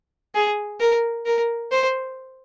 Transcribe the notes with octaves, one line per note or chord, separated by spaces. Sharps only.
G#4
A#4
A#4
C5